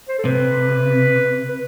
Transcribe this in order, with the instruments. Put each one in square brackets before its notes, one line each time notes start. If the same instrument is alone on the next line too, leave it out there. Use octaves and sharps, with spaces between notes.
[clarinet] C5
A4
[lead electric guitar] C3 [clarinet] B4
[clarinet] B4